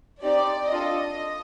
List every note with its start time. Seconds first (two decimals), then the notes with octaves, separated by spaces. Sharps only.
0.22 C4 D#4 G4 D5
0.71 D4 F4 A4 D#5